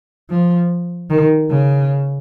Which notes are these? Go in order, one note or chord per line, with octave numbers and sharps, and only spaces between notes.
F3
D#3
C#3